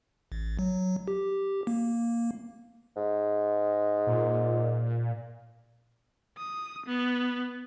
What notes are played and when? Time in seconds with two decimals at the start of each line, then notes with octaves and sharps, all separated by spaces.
0.32 A1
0.59 F#3
1.08 G4
1.67 A#3
2.96 G#2
4.07 A#2
6.38 D#6
6.86 B3